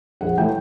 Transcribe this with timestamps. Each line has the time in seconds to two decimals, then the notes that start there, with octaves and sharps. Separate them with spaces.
0.21 A#1 F#5
0.37 A2 E3 A3 G5